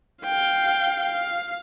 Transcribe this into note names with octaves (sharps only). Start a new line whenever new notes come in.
F5 G5
F5